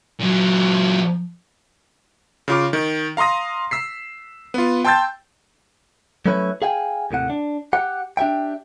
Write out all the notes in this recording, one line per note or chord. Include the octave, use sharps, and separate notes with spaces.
A#2 F#3
C#3 F4 D6
D#3
F5 A#5 C6 D#6 A#6
E6 B6 C7
B3 F4
G5 A5 C6 E6 G6 A6
F#3 A3 C#4 E4 B4 C#5
G#4 F5 G5 G#5
D#2 A2 C3 F#5
D4
G4 F#5
D4 G4 E5 G5